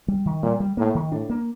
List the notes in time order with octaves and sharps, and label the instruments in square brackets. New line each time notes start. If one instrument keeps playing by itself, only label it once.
[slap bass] G3
D#3
[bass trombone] A#2 [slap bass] G3
[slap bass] G3
[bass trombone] A2 [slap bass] A#3
[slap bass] D#3
[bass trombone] A2 [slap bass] D4
[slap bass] A#3